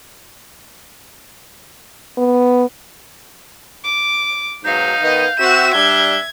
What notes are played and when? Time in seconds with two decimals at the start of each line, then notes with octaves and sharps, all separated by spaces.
2.18 B3
3.84 D6
4.64 G#2 B2 F#3 D#4 F5 G6
5.01 D#3 B3 D#5
5.39 C4 F#4 E5 E7
5.74 G3 D4 G#6 G7